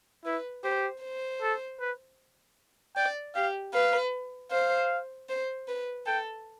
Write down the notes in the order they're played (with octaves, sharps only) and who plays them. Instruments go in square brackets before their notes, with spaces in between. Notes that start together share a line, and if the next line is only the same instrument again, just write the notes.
[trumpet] E4 [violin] B4
[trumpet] G4 [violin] C5
[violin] C5
[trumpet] A4
B4
[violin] D5 [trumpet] G5
[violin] G4 [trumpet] F5
[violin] B4 [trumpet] F5
[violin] C5 [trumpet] F5
[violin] C5
B4
[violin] A4 [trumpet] G5